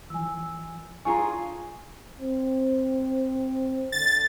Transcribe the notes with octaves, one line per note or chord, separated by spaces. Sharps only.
E3 F3 G#5 E6
D4 F4 G#4 G#5 A#5 C#6
C4
D3 A6